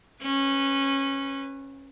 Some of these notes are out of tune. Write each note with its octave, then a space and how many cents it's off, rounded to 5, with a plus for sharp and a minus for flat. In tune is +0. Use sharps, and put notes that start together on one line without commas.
C#4 -20 B4 +5